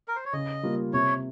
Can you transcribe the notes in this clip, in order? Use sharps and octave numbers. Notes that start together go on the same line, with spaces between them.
A#4
C5
C#5
C#3 D#5
G3 A#3 F4 A#4
C3 C#5